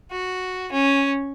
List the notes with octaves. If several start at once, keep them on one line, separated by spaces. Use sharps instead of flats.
F#4
C#4